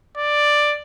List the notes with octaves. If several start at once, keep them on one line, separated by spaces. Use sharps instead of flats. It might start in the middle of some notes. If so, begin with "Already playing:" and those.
D5